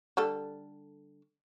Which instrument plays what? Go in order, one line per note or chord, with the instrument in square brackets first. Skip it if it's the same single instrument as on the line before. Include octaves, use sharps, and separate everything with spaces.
[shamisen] D3 G3 A4